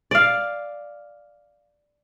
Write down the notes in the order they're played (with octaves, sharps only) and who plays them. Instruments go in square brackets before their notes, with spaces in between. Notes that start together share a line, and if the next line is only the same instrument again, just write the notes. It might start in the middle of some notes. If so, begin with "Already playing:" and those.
[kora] D5 F5